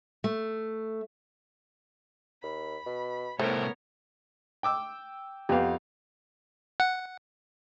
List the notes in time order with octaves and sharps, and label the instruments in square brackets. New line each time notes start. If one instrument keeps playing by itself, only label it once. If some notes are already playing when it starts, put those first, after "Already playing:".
[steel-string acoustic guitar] A3
[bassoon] D#2 [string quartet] B5
[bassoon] B2
[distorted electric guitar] C2 A2 [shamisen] A3 [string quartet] B3 A#4 C#5 [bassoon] C4
[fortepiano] G5 D6 E6
[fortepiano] F2 F5 [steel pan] B3 G4
[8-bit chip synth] F#5